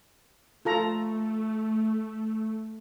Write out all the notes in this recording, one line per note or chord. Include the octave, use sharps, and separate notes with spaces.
A3 F4 A4 A#5